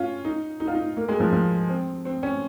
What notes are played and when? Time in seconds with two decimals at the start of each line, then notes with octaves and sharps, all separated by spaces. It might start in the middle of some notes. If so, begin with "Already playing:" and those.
Already playing: C#4 F4
0.25 D#4
0.60 D#4
0.68 F4
0.75 D#4
0.97 A#3
1.08 G#3
1.20 F3
1.33 F3
1.69 C4
2.05 C4
2.23 C#4